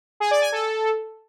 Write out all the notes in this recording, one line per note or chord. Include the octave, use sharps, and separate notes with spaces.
G#4
D5
G#5
A4